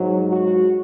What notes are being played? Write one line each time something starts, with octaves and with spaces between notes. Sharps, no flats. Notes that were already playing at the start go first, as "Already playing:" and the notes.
Already playing: G#2 F#3
F#4